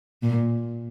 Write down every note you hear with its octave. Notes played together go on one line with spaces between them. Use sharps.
A#2